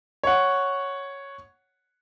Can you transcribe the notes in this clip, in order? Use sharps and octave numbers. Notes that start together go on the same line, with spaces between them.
C#5 F#5